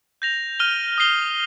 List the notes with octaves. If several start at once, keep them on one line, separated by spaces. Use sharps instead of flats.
G6 A#6 F7
F6 D#7 G7
D#6 C7 G7